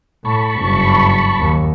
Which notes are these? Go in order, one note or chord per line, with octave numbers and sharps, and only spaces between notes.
A2 A5 B5 C#6
F#1 G2
D#2